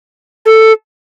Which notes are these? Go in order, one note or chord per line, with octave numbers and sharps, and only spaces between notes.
A4